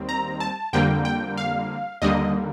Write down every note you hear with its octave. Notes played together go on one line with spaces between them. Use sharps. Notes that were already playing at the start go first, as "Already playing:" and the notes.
Already playing: D#2 D#3 G3 C4
A#5
A5
F2 D3 G3 A#3 G5
G5
F5
D#2 D3 G3 A#3 D#5